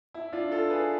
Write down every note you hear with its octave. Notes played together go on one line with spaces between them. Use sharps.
E4
D4 F4
F4 A4
G#4 B4